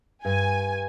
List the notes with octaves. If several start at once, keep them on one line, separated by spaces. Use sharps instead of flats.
G2 G#5